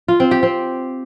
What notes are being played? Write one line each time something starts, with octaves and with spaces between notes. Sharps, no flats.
F4
C4
G4
C4